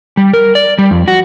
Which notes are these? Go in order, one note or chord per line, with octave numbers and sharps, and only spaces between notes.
G3
A#4
D5
G3
F2
F#4